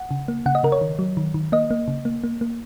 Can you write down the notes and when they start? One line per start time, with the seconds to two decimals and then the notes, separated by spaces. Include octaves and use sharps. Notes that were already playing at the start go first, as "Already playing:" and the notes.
Already playing: F#5
0.11 C#3
0.28 A#3
0.46 C#3 F#5
0.55 D#5
0.63 C#3 A#4
0.72 C#5
0.81 D#3
0.99 F#3
1.17 D#3
1.34 D#3
1.52 A#3 D#5
1.71 A#3
1.88 C#3
2.05 A#3
2.24 A#3
2.41 A#3